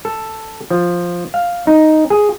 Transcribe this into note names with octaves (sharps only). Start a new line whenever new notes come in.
A4
F3
F5
D#4
G#4